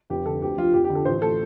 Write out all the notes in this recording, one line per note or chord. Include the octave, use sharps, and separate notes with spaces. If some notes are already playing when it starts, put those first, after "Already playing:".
F1 G4
D3 A4
D2 G4
F3 F4
F1 G4
G4
D3
A4
A1 C5
A3 A4